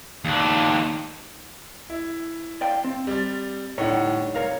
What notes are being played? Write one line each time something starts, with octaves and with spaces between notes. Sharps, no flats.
D#2 D4
E4
D5 F5 G5
C4
G3 A6
A2 D3 G3 D#4 C#5 F#5
C2 A#4 C#5 F5